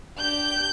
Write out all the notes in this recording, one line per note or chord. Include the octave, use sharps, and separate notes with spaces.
D4 G4 G6